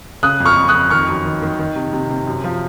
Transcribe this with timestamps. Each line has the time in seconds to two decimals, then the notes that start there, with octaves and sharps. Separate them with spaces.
0.23 C#3 D#6 F#6
0.40 F2
0.45 C#6 F6
0.57 F2
0.68 D#6 F#6
0.74 F2
0.90 D#3 C#6 F6
1.09 F#2
1.25 D#3
1.42 D#3
1.59 D#3
1.76 C3
1.93 C3
2.10 C3
2.27 F#2
2.44 F3